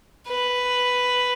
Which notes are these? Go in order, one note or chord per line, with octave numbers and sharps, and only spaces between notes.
B4